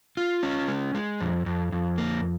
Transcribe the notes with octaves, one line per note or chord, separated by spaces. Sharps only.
F4
C#4
G#3
G#3
F2
F2
F2
A#3